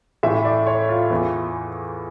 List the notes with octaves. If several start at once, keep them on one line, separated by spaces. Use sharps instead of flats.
A2 E3 E5
D5
C#5
F4
E2 E3